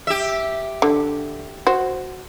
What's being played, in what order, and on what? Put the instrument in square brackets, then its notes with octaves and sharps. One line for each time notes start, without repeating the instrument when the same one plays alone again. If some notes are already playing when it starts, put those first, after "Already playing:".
[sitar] G4 E5
[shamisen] D3
F#4 C5